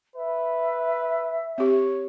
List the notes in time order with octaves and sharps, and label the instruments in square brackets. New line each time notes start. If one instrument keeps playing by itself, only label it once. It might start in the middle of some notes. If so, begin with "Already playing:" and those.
[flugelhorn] B4 [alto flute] E5
[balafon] C4 G4 [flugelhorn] C#5